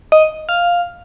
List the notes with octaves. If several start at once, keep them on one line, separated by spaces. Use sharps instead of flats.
D#5
F5